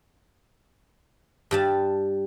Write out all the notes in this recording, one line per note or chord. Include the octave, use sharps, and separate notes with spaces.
G2 G3 A5